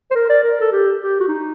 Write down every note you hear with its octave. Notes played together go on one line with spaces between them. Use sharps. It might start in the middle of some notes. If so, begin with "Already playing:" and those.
C5
A#4
D5
A#4
A4
G4
G4
F#4
D#4